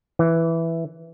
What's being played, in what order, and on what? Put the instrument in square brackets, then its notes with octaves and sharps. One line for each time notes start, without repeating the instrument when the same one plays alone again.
[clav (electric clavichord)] E3